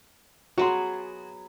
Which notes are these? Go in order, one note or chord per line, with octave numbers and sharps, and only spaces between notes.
F#3 B3 F#4 G#4 C6